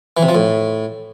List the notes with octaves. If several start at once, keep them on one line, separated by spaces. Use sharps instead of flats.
E3
C3
F3
A2